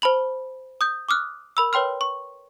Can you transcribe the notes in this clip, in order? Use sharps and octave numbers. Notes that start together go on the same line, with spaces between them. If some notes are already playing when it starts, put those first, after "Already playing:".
C5 A5 B5 F#7
D#6 G6
D6 D#6 F6 F#6
A#4 B5 E6
B4 C#5 G5 C6 F6
C#6